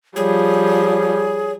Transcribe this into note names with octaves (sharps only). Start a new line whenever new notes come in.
F3 G3 G#4 C#5